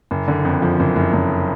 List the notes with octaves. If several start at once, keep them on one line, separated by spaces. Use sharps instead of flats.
F#1
D3
F2
F3
F#1
F#1
F#1